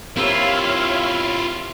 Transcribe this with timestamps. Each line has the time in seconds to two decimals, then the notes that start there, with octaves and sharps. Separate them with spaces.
0.16 A#3 C4 E4 F4 G4 C#5 E5 F5